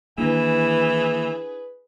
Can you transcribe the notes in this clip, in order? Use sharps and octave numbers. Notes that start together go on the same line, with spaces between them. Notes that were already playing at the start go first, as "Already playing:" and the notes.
D#3 E3 A#3 D4 E4 G#4 B4 A#6